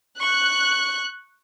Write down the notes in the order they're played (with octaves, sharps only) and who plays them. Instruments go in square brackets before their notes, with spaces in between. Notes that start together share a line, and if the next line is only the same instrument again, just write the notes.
[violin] C#6 [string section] F#6